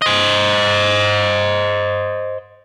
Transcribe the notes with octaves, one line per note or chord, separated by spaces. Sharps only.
C5 D#5